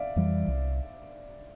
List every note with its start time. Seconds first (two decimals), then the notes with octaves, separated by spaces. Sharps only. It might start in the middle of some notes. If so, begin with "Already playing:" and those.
Already playing: D5 E5 F5
0.16 F2 E3 G3
0.48 C2